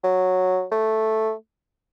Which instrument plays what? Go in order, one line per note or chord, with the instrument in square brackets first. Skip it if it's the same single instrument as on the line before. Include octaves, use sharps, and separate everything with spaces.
[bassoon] F#3
A3